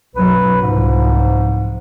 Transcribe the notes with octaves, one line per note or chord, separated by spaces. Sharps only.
B1 F#2 F#3 B4
C2 G#2 F3